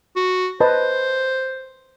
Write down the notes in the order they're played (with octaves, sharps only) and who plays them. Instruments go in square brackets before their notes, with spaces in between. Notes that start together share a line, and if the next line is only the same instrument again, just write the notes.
[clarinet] F#4
[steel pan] B4 D#5 A5 [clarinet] C5